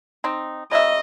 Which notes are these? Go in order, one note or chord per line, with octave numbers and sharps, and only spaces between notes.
C4 D#4
C#3 F#3 D#5 E5